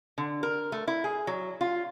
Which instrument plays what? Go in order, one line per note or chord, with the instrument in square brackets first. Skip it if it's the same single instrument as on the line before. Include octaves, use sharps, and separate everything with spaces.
[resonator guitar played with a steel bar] D3
A#4
A3
E4
G#4
F#3
F4